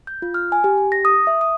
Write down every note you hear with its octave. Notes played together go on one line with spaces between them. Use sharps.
G6
F4
F6
G#5
G4
G4
A#6
D#6
E5
D#6